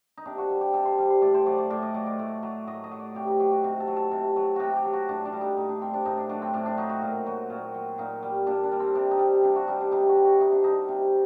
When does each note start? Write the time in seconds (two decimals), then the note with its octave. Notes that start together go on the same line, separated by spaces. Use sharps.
0.17 D#4
0.26 C3 D4
0.38 F#4
0.50 G3
0.61 G4
0.74 C3 A4
0.85 C5
0.98 G3
1.10 C5
1.22 A2 D5
1.34 C5
1.46 F#3 D5
1.58 D5
1.70 A2 D5
1.82 D#5
1.94 F#3 D5
2.06 D5
2.19 A2
2.43 F#3
2.67 A2 D#5
2.84 D#5
2.92 F#3
3.00 D5
3.15 C3 G4
3.27 D#4
3.40 F#3 G4
3.51 F#4
3.64 C3 F#4
3.80 A4
3.87 F#3
3.96 A4
4.12 C3
4.36 F#3
4.56 C3 F#4 G4
4.77 G4
4.85 F#3
4.93 F#4
5.09 A2 D4
5.25 D4
5.33 G3
5.41 D#4
5.57 A2 D#4
5.69 D4
5.81 G3 C4
5.94 D4
6.05 A2 D#4
6.17 D4
6.29 F#3 D4
6.42 C4
6.53 A2 D4
6.66 D4
6.77 F#3 D#4
6.90 F#4
7.02 A#2
7.27 F#3
7.50 A#2
7.75 F#3
7.98 A#2 D#4
8.23 G3
8.47 A#2 D4
8.64 D4
8.72 G3
8.80 C4
8.95 C3 D4
9.11 D#4
9.19 G3
9.43 C3 D4
9.56 F#4
9.67 G3 D#4
9.81 D4
9.92 C3 D#4
10.09 F#4
10.16 G3
10.25 F#4
10.40 C3 D#4
10.52 D4
10.64 G3 D#4
10.89 C3